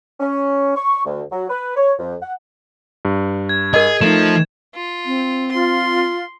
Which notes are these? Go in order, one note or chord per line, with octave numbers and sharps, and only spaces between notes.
C#4
C#6
D2
F#3
B4
C#5
F2
F#5
G2
G#6
G#4 A#4 D#5
F3 A3 D#4 E7
F4
C4
F4 C6